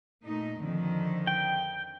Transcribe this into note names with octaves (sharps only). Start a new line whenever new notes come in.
A#2 A3 D#4
F2 D3 D#3
G5